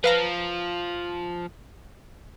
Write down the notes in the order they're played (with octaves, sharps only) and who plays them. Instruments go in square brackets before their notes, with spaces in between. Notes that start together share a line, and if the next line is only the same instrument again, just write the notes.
[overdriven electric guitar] F3 [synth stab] B4 F5 A#5